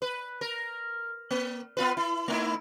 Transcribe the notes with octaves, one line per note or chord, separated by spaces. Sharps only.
B4
A#4
A#3
B3 F4 B4
E4
A3 D#4 E4